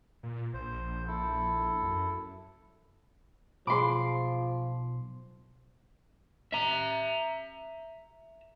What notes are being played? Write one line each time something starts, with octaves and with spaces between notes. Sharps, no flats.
A#2
A#1 C5
E4 A4
F#2
B1 F3 G#4 B5 C6 D6
E5 A#5